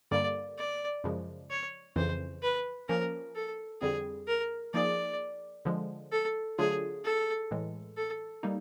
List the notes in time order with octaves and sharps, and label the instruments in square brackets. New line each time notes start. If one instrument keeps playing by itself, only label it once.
[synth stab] G2 D3 G3 A#3 [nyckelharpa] D5
[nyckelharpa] D5
[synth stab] F#2 C#3 F3 G#3
[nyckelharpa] C#5
[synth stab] F2 C#3 E3 [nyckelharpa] C5
[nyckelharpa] B4
[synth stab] F3 A#3 C#4 [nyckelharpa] A#4
[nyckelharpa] A4
[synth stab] F2 D3 G3 C4 [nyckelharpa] G#4
[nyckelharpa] A#4
[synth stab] F3 A#3 D#4 G#4 [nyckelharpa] D5
[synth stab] D3 F3 G#3
[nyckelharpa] A4
[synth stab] D3 F#3 A3 D4 F4 [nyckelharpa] G#4
[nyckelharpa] A4
[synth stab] A2 E3 G#3
[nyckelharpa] A4
[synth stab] G3 A#3 D#4